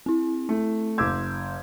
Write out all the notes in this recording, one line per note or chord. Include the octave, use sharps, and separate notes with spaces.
C4 E4
A3
F#1 C6 D6 E6 G6 G#6